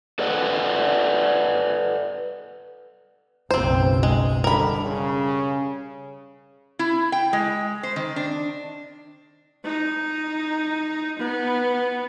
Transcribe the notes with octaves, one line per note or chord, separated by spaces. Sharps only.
A4 B4 D5 D#5 F#5
F#1 B1 C4 C5
G#3
D3 G3 A#4 B5
C#3
E4
G5
G#3
C5
D#3
D4
D#4
B3